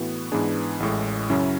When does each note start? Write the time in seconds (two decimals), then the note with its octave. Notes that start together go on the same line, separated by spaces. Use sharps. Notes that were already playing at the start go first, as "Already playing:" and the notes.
Already playing: A2 E3 B3 F#4
0.32 G#2 E3 B3 D4 G#4
0.80 A1 A2 G#3
1.30 F#2 C#3 F#3 C#4 E4